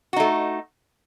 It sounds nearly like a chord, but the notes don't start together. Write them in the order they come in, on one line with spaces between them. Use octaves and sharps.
F#4 D#4 A3